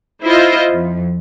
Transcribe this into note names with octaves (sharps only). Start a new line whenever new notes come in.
E4 F4 C5 D#5
F2